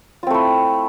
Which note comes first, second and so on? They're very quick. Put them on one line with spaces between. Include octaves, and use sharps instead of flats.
F4 C4 A3 E4